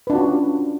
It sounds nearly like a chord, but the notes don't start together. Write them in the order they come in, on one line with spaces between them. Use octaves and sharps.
B4 D4 F4 F#4 C#4